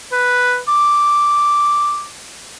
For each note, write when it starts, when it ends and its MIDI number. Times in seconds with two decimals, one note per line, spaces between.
0.12 0.58 71
0.68 2.05 86